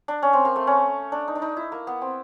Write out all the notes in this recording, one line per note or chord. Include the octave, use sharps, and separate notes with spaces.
D4
C#4
C4
A#3
A3
C#4
D4
D#4
D4
D#4
E4
A#3
B3
C4